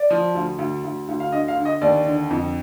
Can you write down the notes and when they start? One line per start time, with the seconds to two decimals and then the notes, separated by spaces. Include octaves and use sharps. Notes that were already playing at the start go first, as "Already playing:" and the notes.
Already playing: D5
0.10 F3
0.34 D2
0.58 D2
0.84 D2
1.08 D2
1.20 F5
1.32 D3 D#5
1.48 F5
1.57 D3
1.65 D#5
1.81 D#2 D5
2.06 D3
2.30 F2